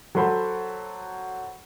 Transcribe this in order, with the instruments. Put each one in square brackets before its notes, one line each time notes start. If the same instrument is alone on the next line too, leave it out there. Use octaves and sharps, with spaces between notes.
[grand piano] F#3 F#4 A4 C5 B5